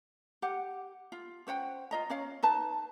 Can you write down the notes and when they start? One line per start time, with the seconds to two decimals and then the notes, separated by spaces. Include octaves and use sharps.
0.42 G4 F#5
1.12 F4
1.47 C#4 C5 F#5 G5
1.91 F4 D#5 A#5
2.10 C#4 C#5 F5
2.43 D#4 B4 A5